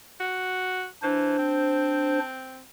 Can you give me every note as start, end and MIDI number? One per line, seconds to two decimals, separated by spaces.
0.20 0.87 66
1.03 1.35 52
1.03 2.19 62
1.03 2.19 72
1.39 2.61 60